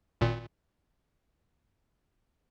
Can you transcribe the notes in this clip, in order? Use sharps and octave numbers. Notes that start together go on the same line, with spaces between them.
G#1 A#2